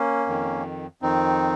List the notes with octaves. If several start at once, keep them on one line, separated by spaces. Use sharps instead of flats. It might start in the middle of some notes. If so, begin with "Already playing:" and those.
Already playing: A#3 C#4
F2 D#3
F2 D#3 C4 D#4